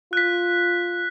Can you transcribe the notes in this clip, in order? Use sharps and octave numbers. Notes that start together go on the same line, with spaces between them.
F4 F#6 B6